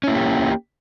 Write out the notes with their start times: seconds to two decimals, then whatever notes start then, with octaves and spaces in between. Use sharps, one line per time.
0.04 C#4
0.07 E4
0.11 A#3
0.15 G4